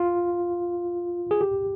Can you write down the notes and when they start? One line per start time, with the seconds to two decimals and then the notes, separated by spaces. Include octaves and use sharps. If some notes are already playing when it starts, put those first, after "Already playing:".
Already playing: F4
1.31 G#4
1.41 G4